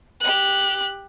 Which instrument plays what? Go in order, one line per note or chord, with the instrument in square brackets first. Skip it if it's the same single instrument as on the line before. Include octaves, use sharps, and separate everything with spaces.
[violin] G4 F#6